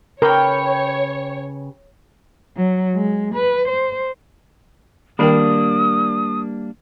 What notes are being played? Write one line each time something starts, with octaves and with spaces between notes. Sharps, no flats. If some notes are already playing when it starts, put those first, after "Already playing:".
C#3 G4 A#4 B4 C#5 G5 G6
F#3
G#3
B4
C5
D#3 G3 A#3 D4 A#4 G5 D#6